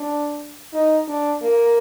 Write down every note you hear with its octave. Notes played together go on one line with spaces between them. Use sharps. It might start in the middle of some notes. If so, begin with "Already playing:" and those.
Already playing: D4
D#4
D4
A#3